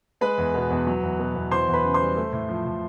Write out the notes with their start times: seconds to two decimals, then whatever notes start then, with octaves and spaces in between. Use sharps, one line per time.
0.21 G#3 B4 B5
0.38 E2
0.54 B2
0.70 E2
0.86 F#3
1.03 E2
1.19 B2
1.35 E2
1.51 E3 C5 C6
1.68 E2
1.73 B4 B5
1.84 C#3
1.94 C5 C6
2.01 G3
2.17 A3
2.33 A2
2.49 F3
2.66 A2